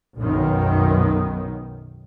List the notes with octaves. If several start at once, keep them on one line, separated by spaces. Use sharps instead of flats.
B1 F#2 D#3